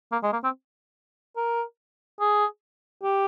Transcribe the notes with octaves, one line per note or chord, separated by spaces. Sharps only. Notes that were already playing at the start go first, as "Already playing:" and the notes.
A#3
G#3
A#3
C4
A#4
G#4
G4